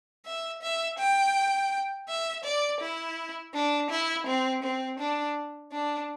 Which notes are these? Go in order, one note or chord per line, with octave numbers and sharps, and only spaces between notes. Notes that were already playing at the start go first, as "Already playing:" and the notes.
E5
E5
G5
E5
D5
E4
D4
E4
C4
C4
D4
D4